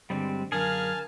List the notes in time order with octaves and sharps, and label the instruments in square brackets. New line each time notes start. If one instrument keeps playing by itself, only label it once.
[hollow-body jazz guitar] G2 D3 [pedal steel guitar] G3 G#3 C4
[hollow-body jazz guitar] F#2 D3 [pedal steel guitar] G#4 F5 [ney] A#4 [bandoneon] G#5 A5 F6